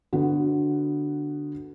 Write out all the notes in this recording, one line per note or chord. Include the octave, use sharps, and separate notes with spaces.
D3 B3 F#4